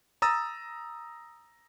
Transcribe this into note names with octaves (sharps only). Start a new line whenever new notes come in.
A#5 D#6 E6 A6